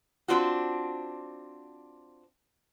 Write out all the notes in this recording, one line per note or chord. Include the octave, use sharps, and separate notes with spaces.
C4 D4 F4 F#4